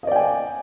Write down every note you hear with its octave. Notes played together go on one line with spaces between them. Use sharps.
D5 D#5 G5 G#5